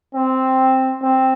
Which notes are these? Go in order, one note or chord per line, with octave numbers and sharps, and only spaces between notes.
C4
C4